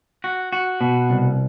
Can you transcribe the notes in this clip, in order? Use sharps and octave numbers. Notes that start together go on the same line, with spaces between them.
F#4
F#4
B2
C2